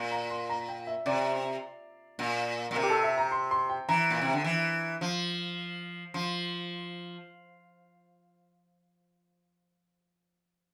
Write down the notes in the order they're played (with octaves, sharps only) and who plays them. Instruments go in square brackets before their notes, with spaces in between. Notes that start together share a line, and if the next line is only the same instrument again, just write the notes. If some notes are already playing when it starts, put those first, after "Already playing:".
Already playing: [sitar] A#2
[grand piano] A#5
C6
A#5
G5
E5
[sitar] C3 [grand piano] D5
[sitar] A#2
A#2
[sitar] C3 [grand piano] A#4
[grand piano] G4
A4
E5
A#5
C6
C6
G5
[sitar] E3 [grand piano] A#5
[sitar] A#2
C3
D3
E3
F3
[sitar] F3 [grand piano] C6